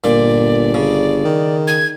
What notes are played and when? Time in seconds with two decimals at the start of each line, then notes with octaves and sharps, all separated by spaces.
0.04 G1 A#2 D5
0.74 C#3
1.25 D#3
1.68 G#6